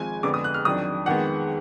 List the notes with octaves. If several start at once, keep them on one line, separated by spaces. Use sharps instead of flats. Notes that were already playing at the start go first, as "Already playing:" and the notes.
Already playing: G#1 F3 G#3 G#5
F2 D3 G#3 B3 D6
D#6
F#6
F6
F2 D#3 F#3 D4 D#6
F2 D#3 G#3 B3 F#5